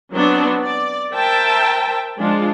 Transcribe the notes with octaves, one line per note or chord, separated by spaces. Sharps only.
F#3 B3 C4 D4
D5
A#4 C5 E5 G5 A5
F3 G#3 D4 F4